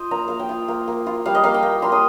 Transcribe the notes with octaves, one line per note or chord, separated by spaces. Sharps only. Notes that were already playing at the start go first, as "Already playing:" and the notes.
Already playing: F4 C5 D#5
A#3 A#5
A#3 F5
G5
F4
A#3
A#3
F4
G3 F5
D#5
A#3 F5
G5
A#3
A#3 C6
D#6